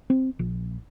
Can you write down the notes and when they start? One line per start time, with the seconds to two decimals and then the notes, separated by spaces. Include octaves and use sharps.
0.10 C4
0.39 A#1